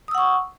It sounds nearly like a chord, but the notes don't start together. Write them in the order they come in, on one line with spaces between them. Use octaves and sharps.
D#6 E6 F#5 C#6